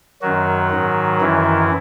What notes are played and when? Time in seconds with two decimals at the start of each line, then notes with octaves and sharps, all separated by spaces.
0.22 F#2 D#3 F#3 F#4
0.71 G#2 D#3
1.21 F#2 D#3 E3 E4